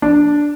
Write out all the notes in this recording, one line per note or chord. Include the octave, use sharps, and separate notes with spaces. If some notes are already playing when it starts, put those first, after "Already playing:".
D4